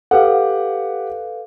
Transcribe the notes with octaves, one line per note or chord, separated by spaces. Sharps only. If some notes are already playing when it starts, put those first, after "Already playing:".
G4 A4 B4 F5 F#5